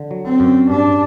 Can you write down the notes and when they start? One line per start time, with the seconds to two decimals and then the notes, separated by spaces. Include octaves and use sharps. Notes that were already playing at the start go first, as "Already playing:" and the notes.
Already playing: D3
0.11 F#3
0.25 C4
0.40 F#2
0.70 G2 D4